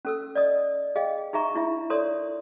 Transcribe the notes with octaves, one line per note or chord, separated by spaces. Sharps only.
C#4 A4 E6
D5 D#5 D#6
G#4 D#5 F5 G5
D#4 G#4 E5 A#5 C#6
D4 E4 F4 E5
A4 A#4 C#5 D5 C6 D#6